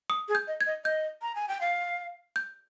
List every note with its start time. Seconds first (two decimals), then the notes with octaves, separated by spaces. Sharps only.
0.10 D#6
0.28 G#4
0.35 G6
0.47 D#5
0.61 G#6
0.66 D#5
0.84 D#5 G6
1.22 A#5
1.35 G#5
1.48 G5
1.61 F5
2.36 G6